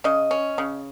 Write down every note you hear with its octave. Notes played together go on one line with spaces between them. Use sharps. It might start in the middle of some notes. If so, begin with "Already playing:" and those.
C#3 D#5
C#4
C#3